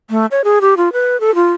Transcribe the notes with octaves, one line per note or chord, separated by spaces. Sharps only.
A3
C#5
G#4
G4
F4
B4
A4
F4